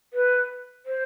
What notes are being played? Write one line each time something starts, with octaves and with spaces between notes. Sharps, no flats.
B4
C5